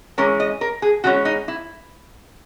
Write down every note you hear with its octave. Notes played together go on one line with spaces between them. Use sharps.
E3 G#3 C#4 A#4
D#5
A#4
G#4
E3 G#3 C#4 F#4
D#4
E4